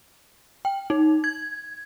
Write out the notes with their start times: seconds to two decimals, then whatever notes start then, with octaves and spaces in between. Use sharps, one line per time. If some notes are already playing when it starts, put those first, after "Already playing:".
0.65 G5
0.90 D#4
1.24 G#6